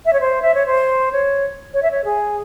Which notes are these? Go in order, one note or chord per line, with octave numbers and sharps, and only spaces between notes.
E5
C#5
C5
E5
C#5
C5
C#5
C#5
E5
C#5
G#4